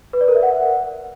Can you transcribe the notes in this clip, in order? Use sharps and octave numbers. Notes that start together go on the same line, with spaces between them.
B4
D5
A#4
E5
F#5